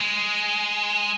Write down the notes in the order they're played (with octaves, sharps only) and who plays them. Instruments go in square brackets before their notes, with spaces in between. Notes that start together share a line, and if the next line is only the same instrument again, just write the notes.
[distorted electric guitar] G#3